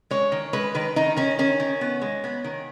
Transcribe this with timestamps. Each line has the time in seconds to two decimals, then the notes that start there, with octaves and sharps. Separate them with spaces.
0.11 G#3 C#5
0.32 D#3
0.53 G#3 B4
0.75 D#3 B4
0.96 D#3 D#4
1.16 D#3 C#4
1.39 D#3 C#4
1.60 D#3
1.81 B3
2.01 G#3
2.24 B3
2.44 D#3